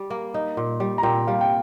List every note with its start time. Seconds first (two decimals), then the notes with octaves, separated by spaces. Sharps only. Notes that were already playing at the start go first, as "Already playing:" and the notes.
Already playing: G3
0.10 A#3
0.34 D#4
0.57 A#2
0.80 G3
0.98 A#5
1.03 A#2 G5
1.27 G3 F5
1.41 G5